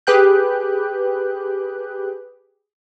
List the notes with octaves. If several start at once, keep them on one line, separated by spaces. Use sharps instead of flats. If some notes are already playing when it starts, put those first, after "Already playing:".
G4 G#4 B4 G5 F#6 G6